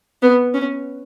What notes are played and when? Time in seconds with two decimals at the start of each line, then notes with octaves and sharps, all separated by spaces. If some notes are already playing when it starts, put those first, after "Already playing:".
0.22 B3
0.54 C#4